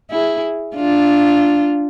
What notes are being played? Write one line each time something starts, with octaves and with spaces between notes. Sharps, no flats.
E4 G#4
D4 F4